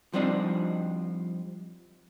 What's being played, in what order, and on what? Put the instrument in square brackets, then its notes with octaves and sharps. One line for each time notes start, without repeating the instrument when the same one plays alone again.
[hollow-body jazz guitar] F3 G3 C4 D4 D#4